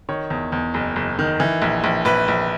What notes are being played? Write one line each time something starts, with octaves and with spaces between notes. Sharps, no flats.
D#3 C#5
E2
E2
F#1
F#1
D#3
E3
A#1
A#1
A#1 B4
A#1